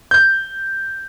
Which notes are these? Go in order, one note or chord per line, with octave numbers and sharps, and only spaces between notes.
G6